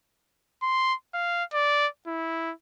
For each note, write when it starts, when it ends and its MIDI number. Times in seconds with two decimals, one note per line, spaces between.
0.63 0.94 84
1.14 1.44 77
1.54 1.87 74
2.07 2.52 64